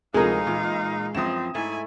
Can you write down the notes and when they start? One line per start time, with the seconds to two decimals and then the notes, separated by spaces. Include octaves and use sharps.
0.14 D2 C3 F3 G#3 D#4 G#4 A#4 F5
0.47 A#2 E3
1.15 F#2 E3 F3 C4 D#6 A#6 E7
1.55 G#2 A3 E4 G#5